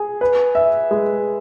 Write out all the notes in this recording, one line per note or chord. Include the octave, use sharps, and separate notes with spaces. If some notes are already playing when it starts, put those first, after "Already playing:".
Already playing: G#4
B4
E5
G#3